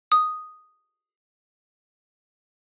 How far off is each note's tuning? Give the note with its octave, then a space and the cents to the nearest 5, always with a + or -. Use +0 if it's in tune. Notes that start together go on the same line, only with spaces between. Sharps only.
D#6 +0